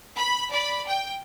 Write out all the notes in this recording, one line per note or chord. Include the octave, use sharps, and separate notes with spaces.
B5
D5 B5
G5